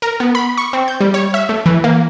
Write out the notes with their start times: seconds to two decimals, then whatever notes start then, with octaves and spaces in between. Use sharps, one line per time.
0.02 A#4
0.20 B3
0.35 B5
0.57 C#6
0.73 C4
0.88 G6
1.00 G3
1.14 C#5
1.34 E5
1.49 A3
1.66 E3
1.84 A#3